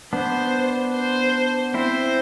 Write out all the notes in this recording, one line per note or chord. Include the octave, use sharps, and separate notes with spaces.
B3 D4 C5
C5
C4 E4 C5